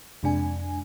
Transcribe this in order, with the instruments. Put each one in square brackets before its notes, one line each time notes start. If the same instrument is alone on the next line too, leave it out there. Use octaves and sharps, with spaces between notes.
[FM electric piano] F2 C3 G#3 D4 G#5